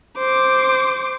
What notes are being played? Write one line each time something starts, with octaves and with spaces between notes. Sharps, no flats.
C5 D6